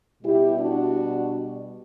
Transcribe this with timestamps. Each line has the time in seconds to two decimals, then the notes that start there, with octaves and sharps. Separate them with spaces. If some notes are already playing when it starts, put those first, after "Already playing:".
0.23 B2 G3 B3 E4 G4
0.60 D4 F#4